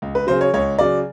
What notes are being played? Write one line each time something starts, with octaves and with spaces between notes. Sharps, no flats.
C#2
B4
C#3 F#3 C5
C#5
C#2 C#5
C#3 F#3 D5